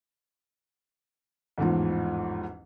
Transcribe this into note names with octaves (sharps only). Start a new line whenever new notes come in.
A1 E2 G#2 F3